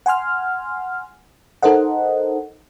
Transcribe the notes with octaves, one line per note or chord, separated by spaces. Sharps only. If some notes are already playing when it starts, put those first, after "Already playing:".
F#5 G#5 C6 F6
D#4 A4 A#4 C5 D#5 F#5